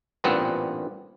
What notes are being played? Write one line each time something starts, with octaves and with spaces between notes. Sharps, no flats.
A1 G2 A#2 B3 C4 F#5